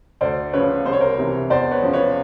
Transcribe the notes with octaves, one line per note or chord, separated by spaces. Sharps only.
D2 C5 D5
C#3 F3 B4 C#5
C2 C5
C#5
A#4 C5
C3 E3
E2 C5 D5
B4 C#5
C#3 F3
B4 C#5